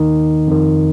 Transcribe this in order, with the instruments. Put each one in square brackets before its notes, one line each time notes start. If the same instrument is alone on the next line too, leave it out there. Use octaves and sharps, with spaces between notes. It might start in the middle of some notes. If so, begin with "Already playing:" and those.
Already playing: [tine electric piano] D#2 D#3 D#4
F2 D#3